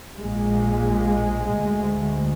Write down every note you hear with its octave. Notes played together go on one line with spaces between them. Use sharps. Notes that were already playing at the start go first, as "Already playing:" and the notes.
A#1 A#2 G#3
D2